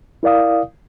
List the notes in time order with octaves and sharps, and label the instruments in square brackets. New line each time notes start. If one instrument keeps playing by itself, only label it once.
[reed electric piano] E4 A#4 D5 F5 D#6